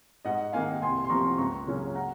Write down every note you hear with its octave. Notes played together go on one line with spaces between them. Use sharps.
G#2 D#5 F#5
D#3 A#3 D#4 F5 G#5
C2 G#5 C6
C6
C3 F3 A#3 F4 A#5 C#6
C#2 A#5 C#6
C#3 F#3 A#3 C#4
F#5 A#5